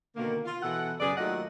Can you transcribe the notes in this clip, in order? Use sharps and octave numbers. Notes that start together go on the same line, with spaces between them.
B2 D3 D#3 A#3
F4
B2 E3 A4 F#5
F#2 C#3 G#4 B4 D5
D#2 F#3 A3 F4 D#5 F#5